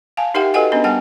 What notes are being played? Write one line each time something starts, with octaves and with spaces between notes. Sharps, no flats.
F5 G#5 A5
D#4 G4 A#4 E5 F#5 G5
F#4 A4 B4 D#5 F#5 G#5
B3 C#4 D4 A#4 D#5
G3 B3 F#5 G5 A5